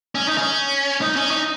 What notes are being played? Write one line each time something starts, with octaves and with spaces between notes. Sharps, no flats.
C#4
D#4
C#4
D#4
C#4
D#4